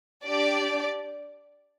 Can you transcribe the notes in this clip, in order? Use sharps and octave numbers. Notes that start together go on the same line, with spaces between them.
D4 G4 D5